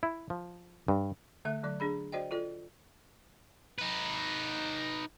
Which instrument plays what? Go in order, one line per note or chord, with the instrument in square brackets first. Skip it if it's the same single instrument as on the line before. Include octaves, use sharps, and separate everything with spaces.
[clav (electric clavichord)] E4
F3
G2
[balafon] D3 A3 E5
D3 F#3 D5
D4 G#4 B5
F#4 C5 D5 D#5 G5
F4 A4 D5
[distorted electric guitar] D#4 B4